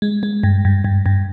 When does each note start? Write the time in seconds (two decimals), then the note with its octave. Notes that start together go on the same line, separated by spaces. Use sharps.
0.02 G#3
0.23 G#3
0.43 G2
0.65 G2
0.84 G2
1.06 G2